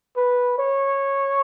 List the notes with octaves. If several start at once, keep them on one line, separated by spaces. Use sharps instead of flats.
B4
C#5